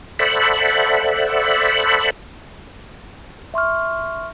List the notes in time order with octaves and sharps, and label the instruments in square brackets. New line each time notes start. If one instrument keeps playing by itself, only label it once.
[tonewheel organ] A4 C5 D5 E5 F#5 B5
[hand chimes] E5 C6 C#6 F6